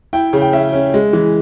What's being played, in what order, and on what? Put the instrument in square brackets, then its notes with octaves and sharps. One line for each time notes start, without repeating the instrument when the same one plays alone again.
[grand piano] E4 G5
C#3
G5
C#4 E5
C#4
G#3
E3